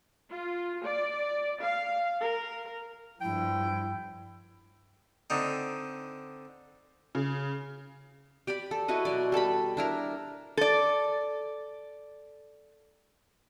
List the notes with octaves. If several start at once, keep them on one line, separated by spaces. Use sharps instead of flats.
F4
D5
F5
A#4
G2 F3 E4 G5
D3 C4 D#4
C#3
G4 D5 G5 B5
A4
E4 F#4 B4 D#5
B2 F#3 D5
G3 A4 A5 B5
D4 E4 A#4
A4 D5